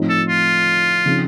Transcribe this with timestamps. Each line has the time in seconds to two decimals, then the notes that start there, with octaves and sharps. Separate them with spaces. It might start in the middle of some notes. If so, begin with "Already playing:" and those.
Already playing: A2 F3 C4 D#4
0.09 A4
0.29 F4
1.06 C#3 F3 C4 D#4